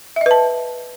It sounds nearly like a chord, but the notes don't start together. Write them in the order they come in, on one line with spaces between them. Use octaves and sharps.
E5 D#5 B4 A5